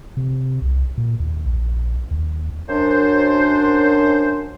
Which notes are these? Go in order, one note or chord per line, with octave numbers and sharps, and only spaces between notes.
C3
C2
A#2
D#2
A#1
D#2
F#2 D4 C5